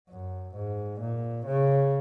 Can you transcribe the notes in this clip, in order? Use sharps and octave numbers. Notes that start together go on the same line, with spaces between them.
F#2
G#2
A#2
C#3